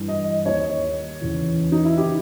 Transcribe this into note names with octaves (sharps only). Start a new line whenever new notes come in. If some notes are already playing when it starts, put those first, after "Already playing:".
Already playing: G2 E3
D#5
D#2 D#3 C#5
E2 C#3 E3
D#4
E4
D#3 G4